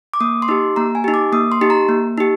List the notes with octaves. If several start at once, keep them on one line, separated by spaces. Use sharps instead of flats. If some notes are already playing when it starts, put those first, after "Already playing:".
D6
A#3 D#6
C6
D#4 G4 D6
A#3 A#5
G#5
D#4 G4
D6
A#3 D#6
C6
D#4 G4
A#5
A#3
D#4 G4